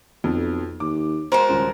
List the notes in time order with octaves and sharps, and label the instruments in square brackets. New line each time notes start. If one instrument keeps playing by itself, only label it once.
[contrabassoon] B1 [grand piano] F2
[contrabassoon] D#2 [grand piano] D6
[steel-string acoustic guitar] G#3 F#4 C5 [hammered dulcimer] A#4 A5
[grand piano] D#1 [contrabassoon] C#2